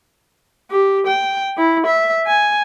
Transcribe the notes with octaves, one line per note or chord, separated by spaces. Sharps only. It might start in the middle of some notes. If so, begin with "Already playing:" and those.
G4
G5
E4
E5
G#5